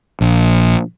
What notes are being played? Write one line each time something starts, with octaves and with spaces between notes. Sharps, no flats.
A#1